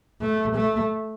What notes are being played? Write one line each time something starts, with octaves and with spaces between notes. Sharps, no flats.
A3
A3